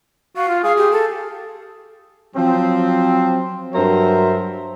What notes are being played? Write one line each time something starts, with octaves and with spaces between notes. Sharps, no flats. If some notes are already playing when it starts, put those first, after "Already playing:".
F#4 F5
F4
G#4 F5
G4
A4
F3 F#3 C4
G2 F#3 A#4 C5 E5